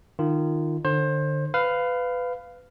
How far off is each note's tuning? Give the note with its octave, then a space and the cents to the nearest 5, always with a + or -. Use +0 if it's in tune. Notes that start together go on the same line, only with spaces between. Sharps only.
D#3 -25 F4 -20
D3 +25 C5 +25
B4 +20 F5 +0